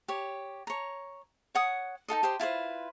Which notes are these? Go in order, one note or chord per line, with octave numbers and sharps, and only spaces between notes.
G4 C#5
C#5 A#5
C#5 F#5 D#6
D#4 F4 A4 D#5
G4 C5 D#5 C6
E4 F4 B4 C5